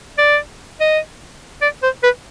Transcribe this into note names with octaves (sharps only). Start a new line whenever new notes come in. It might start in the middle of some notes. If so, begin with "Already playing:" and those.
D5
D#5
D5
C5
B4